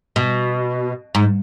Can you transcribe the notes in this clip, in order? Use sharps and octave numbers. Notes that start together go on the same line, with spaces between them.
B2
G#2